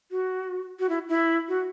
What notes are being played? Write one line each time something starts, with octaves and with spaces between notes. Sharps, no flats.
F#4
F#4
E4
E4
F#4